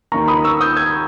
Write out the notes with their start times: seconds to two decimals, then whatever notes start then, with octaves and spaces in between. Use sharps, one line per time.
0.12 D#2 D#3 A#3 A#5 C#6
0.28 B5 D#6
0.44 C#6 E6
0.61 D#6 G6
0.77 E6 G#6